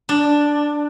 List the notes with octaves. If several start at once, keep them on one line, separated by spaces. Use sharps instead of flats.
D4